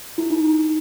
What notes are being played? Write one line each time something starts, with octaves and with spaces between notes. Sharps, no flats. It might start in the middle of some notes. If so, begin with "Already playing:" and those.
E4
D#4